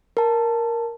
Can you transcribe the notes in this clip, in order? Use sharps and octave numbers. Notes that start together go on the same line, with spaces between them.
A#4 A5